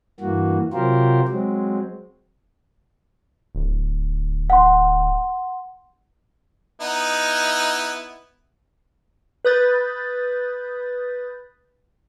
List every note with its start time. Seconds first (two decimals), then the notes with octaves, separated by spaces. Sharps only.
0.20 G2 E3 A#3 F#4
0.73 C3 F#3 F4 G4 A#4 C5
1.28 F#3 G#3 C4
3.55 D1
4.50 F#5 C6
6.81 B3 D#4 E4
9.45 B4 B5 D#6 G6 A6